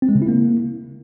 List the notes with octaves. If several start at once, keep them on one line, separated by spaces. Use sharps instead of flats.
C4
G#3
C#3
E4
A#3